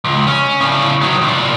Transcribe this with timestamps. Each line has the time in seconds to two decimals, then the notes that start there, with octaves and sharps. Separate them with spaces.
0.04 C#2
0.27 C#4
0.60 A2 C#3
1.01 D#3 F#3
1.22 C2 A#2